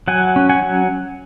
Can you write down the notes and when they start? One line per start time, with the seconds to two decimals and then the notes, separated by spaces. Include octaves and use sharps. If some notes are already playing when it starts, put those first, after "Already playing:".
0.08 F#3 F#5 G#5
0.36 C#4
0.49 F#5 G#5
0.63 F#3